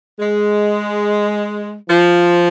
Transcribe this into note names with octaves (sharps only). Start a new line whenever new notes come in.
G#3
F3